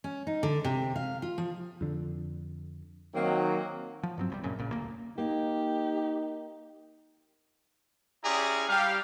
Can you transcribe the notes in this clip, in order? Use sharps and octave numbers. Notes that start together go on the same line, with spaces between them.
C#4
D#4
D3
C3
F5
F4
F3
F2 D3
D#3 F#3 A#3 C4
F3
G2 F#3 C4
C2 E3 G3
F#2 A#2 C#3
A#1 A#2 C#3
D#1 D2 A#3
A#3 D#4 G4
C#4 E4 G4 G#4 D5 A#5
G3 G4 F5